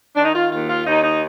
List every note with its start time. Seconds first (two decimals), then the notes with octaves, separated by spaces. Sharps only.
0.16 D#3 D4
0.24 D#4
0.34 F4
0.51 D#2 F4
0.69 F4
0.86 D#2 D#4
1.04 D#4